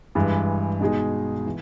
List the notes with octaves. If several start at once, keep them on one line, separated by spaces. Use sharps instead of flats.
G2 E3 G#3
B2 G#3 D#4 G#4
E3